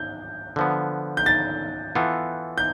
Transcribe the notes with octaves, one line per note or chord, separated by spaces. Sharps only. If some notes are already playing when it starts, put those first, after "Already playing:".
Already playing: G6
D3 F3 B3
G6
A6
E3 B3 F4 A4
G6